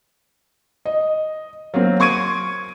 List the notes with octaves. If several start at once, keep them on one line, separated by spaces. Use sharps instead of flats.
D#5
F#3 A#3 C4
C6 C#6 G#6 D7 D#7